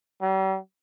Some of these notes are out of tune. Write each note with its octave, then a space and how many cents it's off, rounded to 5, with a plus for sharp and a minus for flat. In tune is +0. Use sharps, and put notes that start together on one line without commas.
G3 -40